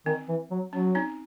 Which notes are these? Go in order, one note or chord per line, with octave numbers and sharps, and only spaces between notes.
D#3 C4
E3
F#3
F#3 C#4
C4 D#4